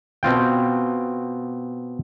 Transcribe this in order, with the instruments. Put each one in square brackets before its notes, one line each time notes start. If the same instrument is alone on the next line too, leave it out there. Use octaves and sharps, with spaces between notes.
[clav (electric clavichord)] B2 C4 F4 G5